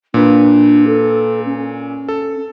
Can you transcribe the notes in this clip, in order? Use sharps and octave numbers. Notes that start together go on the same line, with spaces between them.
A#2 D4 B4
A4
C#4
A4